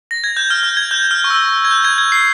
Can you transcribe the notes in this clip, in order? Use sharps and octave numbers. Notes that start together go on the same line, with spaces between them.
A#6
G#6
G6
F6
G6
G#6
G6
F6
C#6
E6
G#6
G6
G#6
G#6
C7